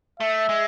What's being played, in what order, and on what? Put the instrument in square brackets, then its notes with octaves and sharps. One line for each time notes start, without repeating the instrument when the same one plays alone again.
[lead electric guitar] A3 [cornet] E5
[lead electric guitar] G#3